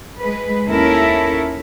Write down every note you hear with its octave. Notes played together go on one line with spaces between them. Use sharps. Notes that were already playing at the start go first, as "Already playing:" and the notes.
G#3 B4
D#2 C#4 E4 A4 A#4 E5